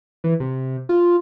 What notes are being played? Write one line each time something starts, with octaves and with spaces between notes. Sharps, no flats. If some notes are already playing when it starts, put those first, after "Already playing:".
E3
C3
F4